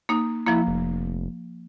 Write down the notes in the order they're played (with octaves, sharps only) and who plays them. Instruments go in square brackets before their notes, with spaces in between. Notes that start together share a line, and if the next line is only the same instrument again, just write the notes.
[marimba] A#3 D#4
[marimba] F3 A#3 [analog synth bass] E4
[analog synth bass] F1